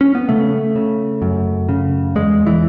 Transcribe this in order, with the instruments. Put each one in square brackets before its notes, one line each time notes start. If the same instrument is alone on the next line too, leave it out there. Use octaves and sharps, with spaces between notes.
[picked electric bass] C#4
B3
C#3 A3
C#3
F#2
C#3
E2 G#3
E3